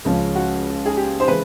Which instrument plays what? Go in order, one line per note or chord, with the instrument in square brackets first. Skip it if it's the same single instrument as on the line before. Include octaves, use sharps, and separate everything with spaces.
[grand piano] C#2 C#3 F3 G#3 C#4
[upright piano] F#4
G#4
G4
C5
[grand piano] C#3 E3 G#3 [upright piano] B4